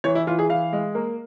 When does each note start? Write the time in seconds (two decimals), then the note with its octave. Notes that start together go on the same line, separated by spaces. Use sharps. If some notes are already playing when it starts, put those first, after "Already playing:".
0.04 E3 C#5
0.15 E4
0.27 E3 F4
0.39 G#4
0.49 E3 F5
0.73 G#3
0.95 A#3